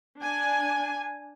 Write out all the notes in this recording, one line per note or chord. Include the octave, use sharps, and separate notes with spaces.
D4 G#5